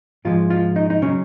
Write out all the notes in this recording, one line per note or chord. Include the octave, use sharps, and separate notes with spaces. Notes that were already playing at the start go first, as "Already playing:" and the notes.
G#2 F3 G#3 F4
F4
D#4
D#4
C#3 F#3 C#4